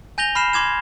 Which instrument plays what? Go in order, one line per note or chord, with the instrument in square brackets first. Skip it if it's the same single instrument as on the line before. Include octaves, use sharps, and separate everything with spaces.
[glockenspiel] G#5 G6 A#6 F7 G7
B5 F6 C7 E7
C6 D6 G#6 E7